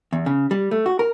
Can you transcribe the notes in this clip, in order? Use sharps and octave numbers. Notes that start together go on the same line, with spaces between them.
E2
C#3
G3
A3
F#4
A#4